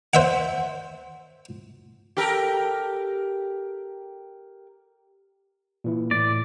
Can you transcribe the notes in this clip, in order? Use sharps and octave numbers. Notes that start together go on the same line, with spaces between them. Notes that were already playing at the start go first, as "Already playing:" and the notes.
C5 E5 F#5
G4 A4 A#4
A#2 E3 E4
A2 D5